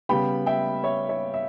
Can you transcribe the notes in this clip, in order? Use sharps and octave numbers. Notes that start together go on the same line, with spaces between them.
C#3 G3 B3 G5 B5
E5 G5
C#5 E5
C#5 E5
E5